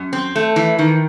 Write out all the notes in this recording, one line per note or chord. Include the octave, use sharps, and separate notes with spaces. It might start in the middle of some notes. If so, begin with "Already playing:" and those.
Already playing: F#2
C4
A3
E3
D#3